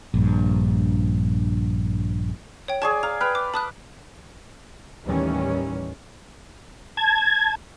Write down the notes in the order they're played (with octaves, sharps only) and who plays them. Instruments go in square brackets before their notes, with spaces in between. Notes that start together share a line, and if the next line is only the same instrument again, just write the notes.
[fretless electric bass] A#1 G2
[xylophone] C#5 G5
[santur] G#4 D5 G#5 [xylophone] A5 C#6
[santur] F5 [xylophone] A#5
[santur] B4 F5 G5
[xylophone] D6
[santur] A5 [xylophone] B5 D#6 F#6
[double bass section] D#2 A2 D#3 E3 G3 C#4
[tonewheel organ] A5 G#6